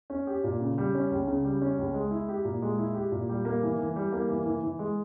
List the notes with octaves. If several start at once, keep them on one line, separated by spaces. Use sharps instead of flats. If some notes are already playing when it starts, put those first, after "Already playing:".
C#4
G4
A#2
C#3
G3
C#4
C#2
C#3
G3
C#4
C#2
G#3
E4
G4
A#2
G#3
E4
G4
A#2
G3
A#3
E3
E3
G3
A#3
E3
E3
E3
G#3